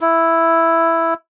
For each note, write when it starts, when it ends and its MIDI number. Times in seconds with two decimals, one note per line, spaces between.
0.01 1.14 64